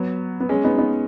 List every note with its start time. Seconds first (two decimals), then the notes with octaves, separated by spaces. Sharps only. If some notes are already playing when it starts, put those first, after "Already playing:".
Already playing: F#3 B3
0.40 B3
0.49 G#3 C#4
0.64 B3 D#4
0.78 B3 D#4